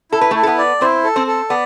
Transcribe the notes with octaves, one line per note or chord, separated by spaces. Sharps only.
E4 A4
B4
A3 E4 A4
A4
B3 B4
D5
C4 E4 C5
A4
C4 C5
A4
B3 D5